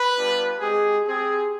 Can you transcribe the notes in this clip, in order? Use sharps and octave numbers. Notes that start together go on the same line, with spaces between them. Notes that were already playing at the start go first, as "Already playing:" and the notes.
Already playing: B4
G3 B3 D4 F4
G#3 C4 G4 G#4
C4 G4 G#4